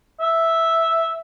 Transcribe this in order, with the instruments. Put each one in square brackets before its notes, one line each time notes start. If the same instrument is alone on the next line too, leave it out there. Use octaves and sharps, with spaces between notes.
[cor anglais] E5